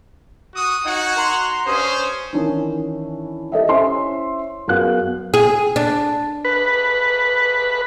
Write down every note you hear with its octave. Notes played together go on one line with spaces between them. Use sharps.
F#4 D#6
D#4 F#4 C#5 F#5
A#5 C6
G2 C#4 C5 D#6
D#3 E3 C#4 D4 E4
G4 A4 D#5 E5
C#4 E4 C5 C#5 E5 C6
F#2 B3 F#4 G#4 F5 F#6
G#4
D4
B4